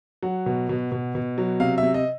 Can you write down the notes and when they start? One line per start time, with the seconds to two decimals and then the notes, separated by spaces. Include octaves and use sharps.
0.23 F#3 F#5
0.46 B2
0.69 B2
0.92 B2
1.15 B2
1.38 F#3
1.60 C3 F5
1.78 E5
1.83 C3
1.94 D#5